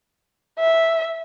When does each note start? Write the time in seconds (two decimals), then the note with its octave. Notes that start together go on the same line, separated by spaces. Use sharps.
0.59 E5